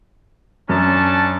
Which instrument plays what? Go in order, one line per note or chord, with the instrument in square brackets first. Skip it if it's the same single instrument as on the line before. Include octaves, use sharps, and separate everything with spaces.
[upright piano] F#2 [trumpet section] C#4 D4 A5